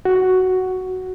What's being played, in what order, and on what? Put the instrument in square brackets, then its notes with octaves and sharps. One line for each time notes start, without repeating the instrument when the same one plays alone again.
[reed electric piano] F#4